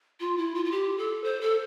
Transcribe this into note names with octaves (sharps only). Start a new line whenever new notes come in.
F4
E4
F4
F4
G4
A4
C5
A4